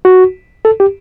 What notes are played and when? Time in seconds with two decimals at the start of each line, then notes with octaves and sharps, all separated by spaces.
0.05 F#4
0.65 A4
0.80 G4